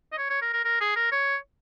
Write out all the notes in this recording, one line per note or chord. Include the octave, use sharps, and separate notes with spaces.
D#5
C#5
C#5
A#4
A#4
A#4
G#4
A#4
C#5